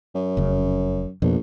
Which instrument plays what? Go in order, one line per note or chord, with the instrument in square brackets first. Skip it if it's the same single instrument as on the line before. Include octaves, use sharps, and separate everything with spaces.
[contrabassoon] F#2
[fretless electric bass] F1 C#3
[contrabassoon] A#1 [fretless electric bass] F2 B2